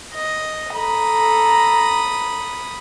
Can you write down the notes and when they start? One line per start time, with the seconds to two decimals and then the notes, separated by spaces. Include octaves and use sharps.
0.14 D#5
0.75 A4 A#5 B5 D#6